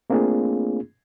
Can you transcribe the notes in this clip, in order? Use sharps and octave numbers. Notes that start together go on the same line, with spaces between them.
A3 A#3 C4 D4 F4 G#4